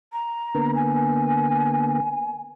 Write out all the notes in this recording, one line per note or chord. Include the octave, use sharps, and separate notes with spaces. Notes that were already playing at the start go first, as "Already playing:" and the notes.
A#5
D3 A#3 B3
G#5